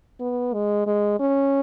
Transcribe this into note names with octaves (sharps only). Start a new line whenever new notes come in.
B3
G#3
G#3
C#4